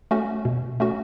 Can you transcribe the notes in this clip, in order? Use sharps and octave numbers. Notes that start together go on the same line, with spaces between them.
A3 C#4 F#4
B2
A3 C#4 F#4